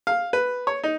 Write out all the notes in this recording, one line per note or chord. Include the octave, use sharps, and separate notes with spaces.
F5
B4
C#5
D#4